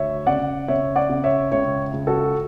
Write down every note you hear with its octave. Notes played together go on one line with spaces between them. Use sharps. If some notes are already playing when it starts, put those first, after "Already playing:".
Already playing: D2 C#5 E5
C#3 D5 F#5
C#3 C#5 E5
D5 F#5
C#3
C#5 E5
C#2 C#5 E5
C#2
F#4 A4